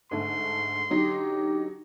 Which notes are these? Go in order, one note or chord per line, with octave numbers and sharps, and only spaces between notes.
G#2 D3 A3 C6
D3 F#3 D#4 G4